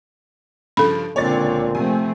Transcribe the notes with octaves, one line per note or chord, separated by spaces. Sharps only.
G2 C#3 F3 A4 B5
C#2 A#2 D3 C4 C#5 D5 A6
C3 F3 A3 C4 G#5